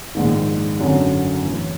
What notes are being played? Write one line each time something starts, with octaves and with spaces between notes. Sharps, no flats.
A#1 G#2 D#3
G#1 F#2 D3
A2 E3 A3